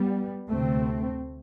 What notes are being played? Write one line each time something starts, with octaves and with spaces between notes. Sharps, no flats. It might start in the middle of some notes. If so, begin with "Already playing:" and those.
Already playing: G3 B3
D2 C3 A3 C4